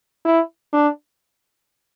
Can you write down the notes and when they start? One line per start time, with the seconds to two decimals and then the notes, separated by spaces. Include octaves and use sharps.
0.25 E4
0.73 D4